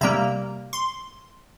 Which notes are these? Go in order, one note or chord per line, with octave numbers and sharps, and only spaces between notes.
C3 G3 A#3 A#5
C6